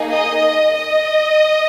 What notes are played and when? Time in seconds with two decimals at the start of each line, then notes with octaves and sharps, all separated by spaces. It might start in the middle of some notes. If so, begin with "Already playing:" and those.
Already playing: A#3 D#4 G#4
0.15 D#5
0.77 D#5